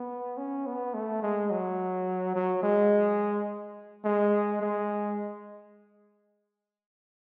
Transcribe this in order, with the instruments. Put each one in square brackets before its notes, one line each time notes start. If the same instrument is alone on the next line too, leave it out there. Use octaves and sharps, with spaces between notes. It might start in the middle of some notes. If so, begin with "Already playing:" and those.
Already playing: [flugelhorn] B3
C#4
B3
A3
G#3
F#3
F#3
G#3
G#3
G#3